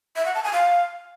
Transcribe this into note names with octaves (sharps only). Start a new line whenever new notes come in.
E5
F#5
A5
G#5
F5